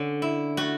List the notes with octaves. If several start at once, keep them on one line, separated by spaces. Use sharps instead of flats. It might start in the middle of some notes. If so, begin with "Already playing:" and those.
Already playing: D3 C#4
E4
A3 F#4